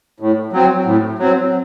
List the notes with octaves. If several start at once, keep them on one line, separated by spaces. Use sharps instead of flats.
A2
F#3 C4
A2
F#3 C4